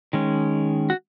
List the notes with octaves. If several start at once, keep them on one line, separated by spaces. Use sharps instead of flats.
D#3 G#3 C#4
F#4